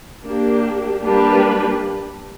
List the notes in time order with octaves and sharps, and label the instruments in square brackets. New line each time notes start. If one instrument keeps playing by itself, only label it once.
[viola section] A#3 D4 G4
G3 A#3 D4 G4 B4